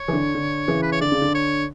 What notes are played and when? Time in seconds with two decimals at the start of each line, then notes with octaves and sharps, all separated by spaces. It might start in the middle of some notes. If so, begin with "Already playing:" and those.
Already playing: C#5
0.08 E3
0.13 D3
0.35 D3
0.68 C#3 E3
0.82 B4
0.92 C#5
1.01 D3 D5
1.12 C#3
1.22 D3
1.35 C#5